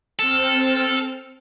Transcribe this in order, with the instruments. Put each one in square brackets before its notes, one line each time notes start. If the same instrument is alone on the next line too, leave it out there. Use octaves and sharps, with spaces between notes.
[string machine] C4 F6 [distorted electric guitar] A4